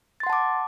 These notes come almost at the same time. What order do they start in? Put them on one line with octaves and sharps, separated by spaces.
A6 C6 F#5 A5 D6